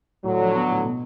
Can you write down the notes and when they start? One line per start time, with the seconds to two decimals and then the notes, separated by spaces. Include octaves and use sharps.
0.24 A2 D3 F#3
0.40 F3
0.54 B3
0.70 A2
0.84 B2